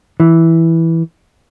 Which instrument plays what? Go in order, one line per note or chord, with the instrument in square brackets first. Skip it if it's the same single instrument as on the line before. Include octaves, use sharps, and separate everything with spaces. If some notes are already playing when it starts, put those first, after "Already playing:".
[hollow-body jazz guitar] E3